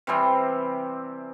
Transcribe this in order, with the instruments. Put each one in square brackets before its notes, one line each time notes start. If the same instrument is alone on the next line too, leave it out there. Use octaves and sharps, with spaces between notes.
[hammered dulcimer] C3 E3 G3 C4